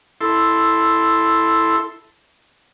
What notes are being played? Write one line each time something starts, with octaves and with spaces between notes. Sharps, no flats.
E4 A4 C6